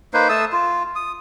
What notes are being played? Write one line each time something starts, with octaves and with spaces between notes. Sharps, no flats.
A#3 D#4 B4 C5
A3 A5 D#6 E6
F4
D#6